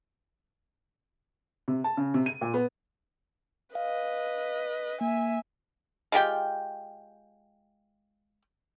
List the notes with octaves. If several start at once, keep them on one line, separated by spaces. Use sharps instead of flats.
C3
A5
C#3
C3
D#7
A#2
B3
B4 D#5 F5
A#3 E5 G#5
G#3 F4 G4 G5